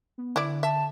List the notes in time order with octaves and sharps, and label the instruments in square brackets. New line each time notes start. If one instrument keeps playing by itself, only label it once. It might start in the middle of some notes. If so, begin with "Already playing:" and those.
[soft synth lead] B3
[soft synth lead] D3 [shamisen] E4 D5
[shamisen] E5 [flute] A5